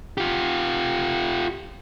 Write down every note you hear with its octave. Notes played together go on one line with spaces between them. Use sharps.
F4 G4